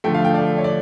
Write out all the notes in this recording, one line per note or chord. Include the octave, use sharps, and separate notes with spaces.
D3 F3 A3 G5
F5
G5
D5
C#5
D5